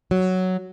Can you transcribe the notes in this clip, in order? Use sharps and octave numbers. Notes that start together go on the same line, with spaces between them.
F#3